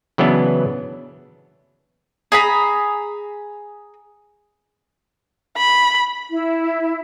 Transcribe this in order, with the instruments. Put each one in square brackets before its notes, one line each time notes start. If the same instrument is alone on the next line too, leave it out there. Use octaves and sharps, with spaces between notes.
[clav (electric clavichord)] C#3 E3 F#3 B3 D4
[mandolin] G#4 A#5 B5
[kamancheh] B5
[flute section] E4